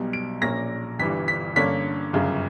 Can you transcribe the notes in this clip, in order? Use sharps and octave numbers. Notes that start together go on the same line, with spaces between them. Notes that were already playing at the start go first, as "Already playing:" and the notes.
Already playing: B1 B2 G3
D7
A#1 A#2 A#3 C#4 A#6
G1 G2 E3 G3 B6
B6
G2 D3 A#3 C#4 B6
G1 F#2 C#3